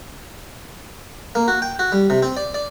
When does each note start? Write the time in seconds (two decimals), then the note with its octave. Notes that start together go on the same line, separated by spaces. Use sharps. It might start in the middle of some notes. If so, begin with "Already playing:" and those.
1.35 A#3
1.48 F#4
1.62 G5
1.79 F#4
1.92 G3
2.10 C3
2.23 C4
2.37 D5
2.54 D5